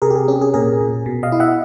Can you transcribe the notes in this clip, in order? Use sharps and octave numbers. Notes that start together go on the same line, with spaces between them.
C3 G#4 A#4
G4
G#4
C#4 G4
G#4
A#2 G#4 A#4
A#2
B2
D#5 F5
E4
E5 F#5